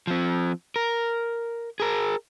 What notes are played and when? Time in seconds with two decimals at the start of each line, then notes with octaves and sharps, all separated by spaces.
0.07 F3 C4
0.76 A#4
1.80 G#4 A#4